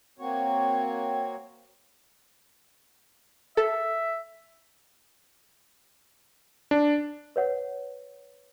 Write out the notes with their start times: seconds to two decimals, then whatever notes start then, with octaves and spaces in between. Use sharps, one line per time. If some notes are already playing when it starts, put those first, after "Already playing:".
0.19 A#3 C4 F#4 C#5
3.57 A4 E5
6.71 D4
7.36 B4 C#5 F#5